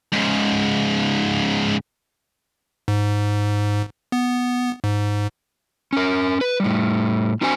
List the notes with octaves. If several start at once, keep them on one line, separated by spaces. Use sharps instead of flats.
G#2 C#3
G#2
B3
G#2
C#4 A#4
B4
A2 G3
C4 D4 F#4 C5 G#5